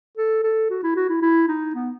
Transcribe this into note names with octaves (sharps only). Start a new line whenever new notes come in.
A4
A4
F#4
E4
F#4
E4
E4
D#4
B3